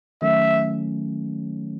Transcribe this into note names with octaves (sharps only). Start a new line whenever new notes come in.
D#3 F#3 A3 C#4 E5